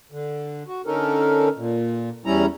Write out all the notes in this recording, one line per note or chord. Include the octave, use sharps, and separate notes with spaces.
D3
F#4
D3 C#4 D#4 A4 A#4
A#2
E2 G3 C#4 E4 A#5